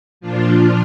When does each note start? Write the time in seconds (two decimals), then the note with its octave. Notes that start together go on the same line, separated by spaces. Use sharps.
0.21 A#2 F3 D4 F4